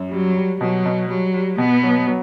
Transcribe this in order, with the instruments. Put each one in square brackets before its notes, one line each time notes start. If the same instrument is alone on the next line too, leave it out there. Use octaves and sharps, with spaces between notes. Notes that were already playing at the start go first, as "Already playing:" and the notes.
Already playing: [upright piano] F#2
[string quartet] F#3 [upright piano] G3
[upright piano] G3
[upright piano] B2 [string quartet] F#3
[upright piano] B2
[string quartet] F#3 [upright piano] G3
[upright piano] G3
[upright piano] B2 [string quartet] B3
[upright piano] F#3
F#3